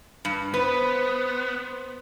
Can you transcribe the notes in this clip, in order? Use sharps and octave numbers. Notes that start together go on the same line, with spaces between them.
G2
B3 B4 C5